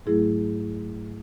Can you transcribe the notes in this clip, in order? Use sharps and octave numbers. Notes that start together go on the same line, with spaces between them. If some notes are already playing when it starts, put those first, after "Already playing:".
G#2 F#3 A3 E4 G#4